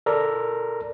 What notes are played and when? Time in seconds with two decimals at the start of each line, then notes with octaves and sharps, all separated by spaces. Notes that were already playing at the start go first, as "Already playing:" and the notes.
0.06 A4 A#4 D5 A#5